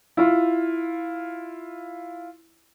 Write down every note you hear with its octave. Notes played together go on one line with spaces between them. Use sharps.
E4 F4